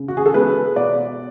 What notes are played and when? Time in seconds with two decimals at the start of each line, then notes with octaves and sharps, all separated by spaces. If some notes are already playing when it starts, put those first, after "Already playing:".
Already playing: C#3
0.08 F#4
0.17 G#4
0.26 A4
0.34 G#3 B3 B4
0.76 B2 D5